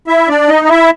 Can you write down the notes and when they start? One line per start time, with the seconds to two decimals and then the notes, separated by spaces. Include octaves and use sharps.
0.07 E4 E5
0.29 D4 D5
0.48 D#4 D#5
0.65 D#5
0.69 E4 E5